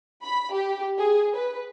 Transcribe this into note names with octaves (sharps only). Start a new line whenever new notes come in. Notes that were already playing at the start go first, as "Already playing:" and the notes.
B5
G4
G#4
B4